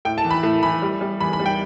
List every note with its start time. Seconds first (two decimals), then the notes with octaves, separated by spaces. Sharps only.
0.05 A2 G5
0.18 A5
0.25 E3
0.30 B5
0.43 A2
0.63 E3 B5
0.82 G3
1.01 G3
1.20 E2 B5
1.33 B5
1.39 G3
1.46 G5